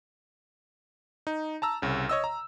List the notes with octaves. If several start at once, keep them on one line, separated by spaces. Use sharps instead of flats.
D#4
A5 A#5 E6
C2 C#3
C#5 D#5 E6
A#5